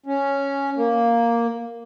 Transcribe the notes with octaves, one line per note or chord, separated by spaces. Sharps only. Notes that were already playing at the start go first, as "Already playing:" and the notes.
C#4
A#3